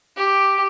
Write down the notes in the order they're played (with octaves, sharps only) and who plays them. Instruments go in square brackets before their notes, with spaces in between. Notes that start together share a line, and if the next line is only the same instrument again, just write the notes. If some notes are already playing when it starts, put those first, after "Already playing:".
[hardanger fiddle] G4